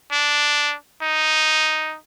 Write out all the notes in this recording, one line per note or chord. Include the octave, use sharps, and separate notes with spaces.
D4
D#4